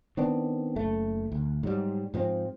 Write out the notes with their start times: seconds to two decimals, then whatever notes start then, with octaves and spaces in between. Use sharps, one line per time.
0.17 D#3 B3 C4 D4
0.76 F#1 A3
1.32 D2
1.63 G#2 F#3 G3
2.14 G#2 F3 B3 C4